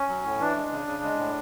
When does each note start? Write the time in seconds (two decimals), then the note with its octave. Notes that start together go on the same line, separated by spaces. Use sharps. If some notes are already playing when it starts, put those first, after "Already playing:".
Already playing: C#4
0.09 F#3
0.24 A2
0.40 E3 D4
0.56 G#3
0.71 C#3
0.87 C#3
1.03 G#3
1.18 A2